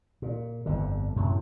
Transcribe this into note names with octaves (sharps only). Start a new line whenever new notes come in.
A#2
G1 F2 D3
F#2 A2 C3 F#3